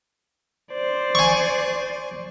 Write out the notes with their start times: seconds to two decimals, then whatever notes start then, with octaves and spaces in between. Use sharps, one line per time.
0.72 C5 D5
1.15 G#5 C#6